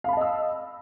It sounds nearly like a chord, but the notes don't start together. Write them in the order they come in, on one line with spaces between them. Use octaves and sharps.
F5 B5 A5 D#5 E6